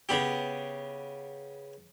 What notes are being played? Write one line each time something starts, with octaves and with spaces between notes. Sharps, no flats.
C#3 B3 G4